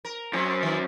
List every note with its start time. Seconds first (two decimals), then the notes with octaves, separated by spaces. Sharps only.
0.05 A#4
0.33 F#2 F#3 C4
0.63 D#3